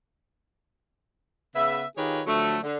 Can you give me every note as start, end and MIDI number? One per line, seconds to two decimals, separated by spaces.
1.55 1.82 49
1.55 1.82 59
1.55 1.82 71
1.55 1.82 76
1.96 2.21 51
1.96 2.21 65
1.96 2.21 67
1.96 2.21 68
1.96 2.21 71
1.96 2.21 73
2.26 2.58 50
2.26 2.58 53
2.26 2.58 54
2.26 2.58 57
2.63 2.78 50